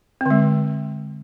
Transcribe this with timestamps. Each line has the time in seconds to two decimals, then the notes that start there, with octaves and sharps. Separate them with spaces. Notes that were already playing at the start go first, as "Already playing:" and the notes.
0.21 C4
0.26 D3
0.30 G#3